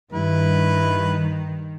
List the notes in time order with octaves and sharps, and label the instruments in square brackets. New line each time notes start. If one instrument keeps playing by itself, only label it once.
[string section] G2 [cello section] D#3 [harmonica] E4 B4